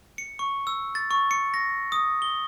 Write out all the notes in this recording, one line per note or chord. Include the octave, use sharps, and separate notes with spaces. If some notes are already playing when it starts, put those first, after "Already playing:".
C#7
C#6
E6
A6
C#6
C#7
A#6
D#6
G7